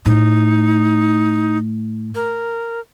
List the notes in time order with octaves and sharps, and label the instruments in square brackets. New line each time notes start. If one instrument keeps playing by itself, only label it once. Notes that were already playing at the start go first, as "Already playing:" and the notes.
[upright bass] A2 [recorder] D#4
[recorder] A#4